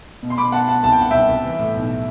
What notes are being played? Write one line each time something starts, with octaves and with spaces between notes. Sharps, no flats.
B2
C6
B2 B5 D6
B2 F#5 A5
B2 F#5 A5
C2 A5
G5
C2 F#5
C2 E5 G5
C2
E3
A2
B1